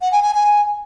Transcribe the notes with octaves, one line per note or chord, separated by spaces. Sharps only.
F#5
G#5
G#5
G#5